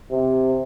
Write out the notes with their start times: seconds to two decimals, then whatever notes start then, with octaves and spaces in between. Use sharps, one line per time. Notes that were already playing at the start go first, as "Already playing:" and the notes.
0.12 C3